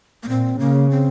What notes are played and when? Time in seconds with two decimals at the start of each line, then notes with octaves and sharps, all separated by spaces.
0.23 A#3
0.29 A#2 C4
0.59 C#3 A#3
0.91 C4